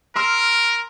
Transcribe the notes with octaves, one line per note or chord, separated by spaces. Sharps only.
A#4 C6 E6 F6